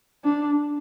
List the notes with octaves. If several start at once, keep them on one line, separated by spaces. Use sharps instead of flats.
D4